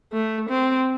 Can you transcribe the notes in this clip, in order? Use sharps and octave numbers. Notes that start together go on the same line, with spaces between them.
A3
C4